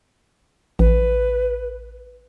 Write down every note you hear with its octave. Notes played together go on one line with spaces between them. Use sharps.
A1 B4